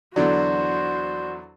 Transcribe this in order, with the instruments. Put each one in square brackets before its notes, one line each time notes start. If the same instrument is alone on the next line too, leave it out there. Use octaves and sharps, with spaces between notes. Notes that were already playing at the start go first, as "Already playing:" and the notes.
[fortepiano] E2 D3 F#3 [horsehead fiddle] F#4 C5 [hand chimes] D5